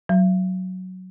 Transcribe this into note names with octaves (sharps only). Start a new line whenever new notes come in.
F#3